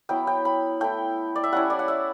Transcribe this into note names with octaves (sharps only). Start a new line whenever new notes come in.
F#3 B3 E4 G5
G5
B5
A3 E4 G5
D5
E5
G3 C#4 E4 F#5
D5
F#5
E5